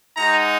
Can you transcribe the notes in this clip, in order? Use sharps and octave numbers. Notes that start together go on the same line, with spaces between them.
G#3 D#4 F#4 A#5